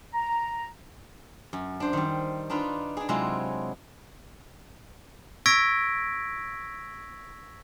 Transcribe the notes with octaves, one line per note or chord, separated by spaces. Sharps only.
A#5
F#2
D4 C5
D#3 G3
D4 D#4 F4 B4
D4 G#4
C3 F#3 G#3 E4 F4 G#4
C#6 E6 G#6 A#6 B6 D7